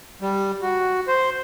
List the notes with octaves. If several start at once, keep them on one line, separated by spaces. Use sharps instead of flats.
G3
F#4
C5